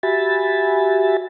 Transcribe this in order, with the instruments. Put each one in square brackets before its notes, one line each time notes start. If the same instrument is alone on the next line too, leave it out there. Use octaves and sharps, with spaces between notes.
[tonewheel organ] F#4 G4 E5 G#5 B5 A6